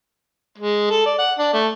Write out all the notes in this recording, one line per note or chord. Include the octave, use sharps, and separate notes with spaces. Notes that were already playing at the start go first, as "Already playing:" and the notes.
G#3
A4
D5
F#5
D4
A3